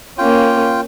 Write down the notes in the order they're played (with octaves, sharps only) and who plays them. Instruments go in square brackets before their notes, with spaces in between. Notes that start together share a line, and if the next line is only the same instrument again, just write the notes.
[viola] A#3 C#4 [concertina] F4 G5